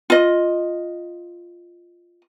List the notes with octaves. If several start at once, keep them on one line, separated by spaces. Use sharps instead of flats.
F4 D#5